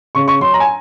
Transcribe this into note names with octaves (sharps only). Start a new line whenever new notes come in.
C#3 C#6
C#6
F#3 C6
A#5
G#5